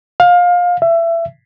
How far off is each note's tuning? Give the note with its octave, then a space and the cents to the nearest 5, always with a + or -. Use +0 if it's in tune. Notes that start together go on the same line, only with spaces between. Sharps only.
F5 +25
E5 +25